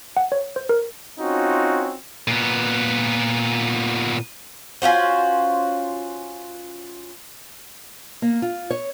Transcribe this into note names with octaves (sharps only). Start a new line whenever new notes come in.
F#5
C#5
C5
A#4
C4 C#4 D#4 F4 F#4
A#2 B3
C#4 F4 F#4 C5
A#3
F4
C#5